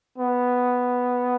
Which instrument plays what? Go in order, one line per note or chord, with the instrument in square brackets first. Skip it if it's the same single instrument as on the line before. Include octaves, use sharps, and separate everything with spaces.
[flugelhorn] B3